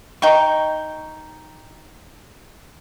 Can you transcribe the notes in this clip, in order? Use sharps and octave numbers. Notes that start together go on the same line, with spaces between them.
D#4 G5 C#6